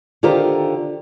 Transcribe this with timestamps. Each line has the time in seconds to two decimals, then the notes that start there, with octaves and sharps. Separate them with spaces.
0.23 D3 D#3 F4 G4 A#4 C5